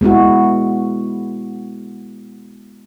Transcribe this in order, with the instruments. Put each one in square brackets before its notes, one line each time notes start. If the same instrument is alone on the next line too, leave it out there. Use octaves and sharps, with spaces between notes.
[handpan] G#3 B3 E4 F#4